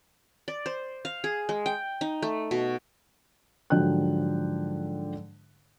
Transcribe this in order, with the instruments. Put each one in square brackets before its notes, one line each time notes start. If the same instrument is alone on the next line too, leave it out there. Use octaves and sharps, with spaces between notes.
[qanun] D5
C5
F5
G#4
G#3
G5
D#4
A3
B2
[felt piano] G#2 D3 F3 F#3 G5 F#6